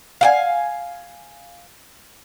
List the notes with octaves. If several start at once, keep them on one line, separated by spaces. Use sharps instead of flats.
F5 G5 G#5